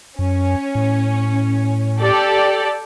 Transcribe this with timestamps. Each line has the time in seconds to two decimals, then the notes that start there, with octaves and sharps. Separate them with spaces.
0.19 F#2 C#4
0.75 A2
2.01 G4 A4 D5